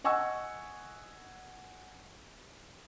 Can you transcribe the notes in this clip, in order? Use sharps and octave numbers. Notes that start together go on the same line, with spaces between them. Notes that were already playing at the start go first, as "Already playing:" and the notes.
D#5 F#5 G#5 C#6 E6